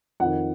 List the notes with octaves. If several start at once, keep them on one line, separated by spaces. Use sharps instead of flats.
F2 F#5
D#3